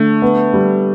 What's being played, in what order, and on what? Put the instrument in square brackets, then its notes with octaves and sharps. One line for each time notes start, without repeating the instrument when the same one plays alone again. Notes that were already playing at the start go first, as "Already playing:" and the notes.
Already playing: [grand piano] D3 [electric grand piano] A3
[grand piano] B3
G3